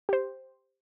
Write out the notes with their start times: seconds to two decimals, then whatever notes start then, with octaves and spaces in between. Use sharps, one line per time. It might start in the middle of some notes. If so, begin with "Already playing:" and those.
0.09 G4 C5